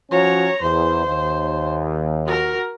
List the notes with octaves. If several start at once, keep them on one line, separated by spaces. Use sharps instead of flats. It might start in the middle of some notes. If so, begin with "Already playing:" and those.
F3 C#4 F#4 C#5 A#5
E2 C5
D#2
F#4 A#4